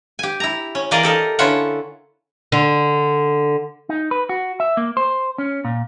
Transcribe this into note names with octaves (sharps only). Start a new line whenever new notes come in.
G4 G#5
E4 A#5
C#4
E3 A#3 G#4 A#4 D5 D#5
G4 A4 A#4 D#5
D3 C#4 E4 F4 E5 F#5
D3
D#4
B4
F#4
E5
A#3
C5
C#4
A#2